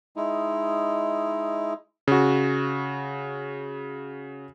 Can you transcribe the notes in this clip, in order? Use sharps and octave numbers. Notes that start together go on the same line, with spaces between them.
G#3 D#4 E4
C#3 F#4